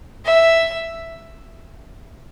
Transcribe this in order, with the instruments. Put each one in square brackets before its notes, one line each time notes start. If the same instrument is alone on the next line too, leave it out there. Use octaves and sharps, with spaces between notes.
[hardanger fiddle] E5